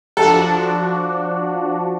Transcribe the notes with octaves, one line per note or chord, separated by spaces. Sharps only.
F3 D4 F#4 A4